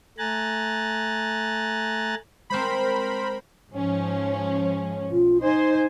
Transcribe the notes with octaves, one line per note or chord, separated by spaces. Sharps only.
A3 G#5 A#5 F#6 A6
G#3 C4 A#4 C5 B5
G#2 F3 C#4
B1 F4
D#4 C5 D#5 G#5